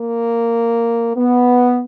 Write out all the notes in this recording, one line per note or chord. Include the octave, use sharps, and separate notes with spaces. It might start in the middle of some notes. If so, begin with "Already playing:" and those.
Already playing: A#3
B3